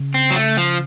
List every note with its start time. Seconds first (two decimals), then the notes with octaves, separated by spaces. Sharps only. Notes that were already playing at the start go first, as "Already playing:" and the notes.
Already playing: C#3
0.14 C4
0.31 F#3
0.36 A3
0.57 F3